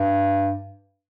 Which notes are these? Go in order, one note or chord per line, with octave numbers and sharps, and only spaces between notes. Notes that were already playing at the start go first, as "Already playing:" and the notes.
Already playing: G2